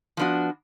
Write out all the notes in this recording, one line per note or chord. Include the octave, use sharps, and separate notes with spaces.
F3 B3 D4 F#4